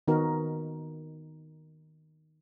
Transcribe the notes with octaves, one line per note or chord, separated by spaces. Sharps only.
D#3 B3 D#4 F#4 A#4